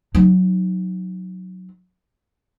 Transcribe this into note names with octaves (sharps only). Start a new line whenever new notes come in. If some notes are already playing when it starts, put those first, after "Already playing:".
F#3 D#4